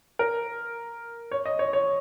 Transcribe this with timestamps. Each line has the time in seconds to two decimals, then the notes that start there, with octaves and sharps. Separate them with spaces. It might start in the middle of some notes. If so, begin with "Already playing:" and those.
0.19 A#4
1.31 C#5
1.45 D#5
1.59 C#5
1.73 C#5